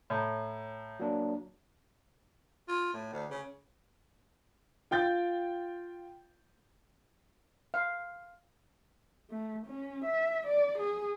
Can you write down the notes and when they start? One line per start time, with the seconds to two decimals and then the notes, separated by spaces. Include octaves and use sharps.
0.10 A2 C#5 A#5
1.00 F#3 A#3 D4
2.68 F4
2.93 A2
3.13 D2
3.31 C#3
4.91 F4 G5 G6 A6
7.74 F5
9.30 A3
9.66 C#4
10.05 E5
10.47 D5
10.79 G#4